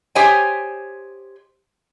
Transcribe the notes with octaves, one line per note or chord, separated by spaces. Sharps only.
G4 C5 C#5 D#5 G5 G#5